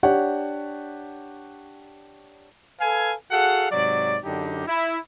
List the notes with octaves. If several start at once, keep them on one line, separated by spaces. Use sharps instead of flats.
D4 G4 C#5 F#5
A4 B4 F5 G#5
F#4 G#4 A4 F5 F#5
G#2 C3 F#3 D5
F#2 D3 D4 D#4 G4
E4